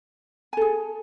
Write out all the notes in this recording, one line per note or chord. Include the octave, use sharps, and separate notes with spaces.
G#4 A4 G#5